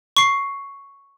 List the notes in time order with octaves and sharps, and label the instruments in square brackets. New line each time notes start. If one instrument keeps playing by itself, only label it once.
[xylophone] C#6 C7